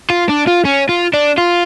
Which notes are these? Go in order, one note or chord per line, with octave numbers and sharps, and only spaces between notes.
F4
D4
F4
C#4
F4
D4
F4